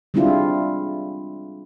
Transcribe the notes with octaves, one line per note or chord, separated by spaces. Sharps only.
G3 G#3 C4 D4 E4 F4